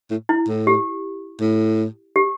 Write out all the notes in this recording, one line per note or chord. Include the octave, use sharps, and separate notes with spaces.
A2
E4
A2
G4
A2
G4